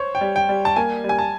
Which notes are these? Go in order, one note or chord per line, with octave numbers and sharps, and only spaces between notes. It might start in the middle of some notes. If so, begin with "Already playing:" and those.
Already playing: C5 C#5
G5
G3
G5
G3
A5
A#3 G#5
G3
G#5
A5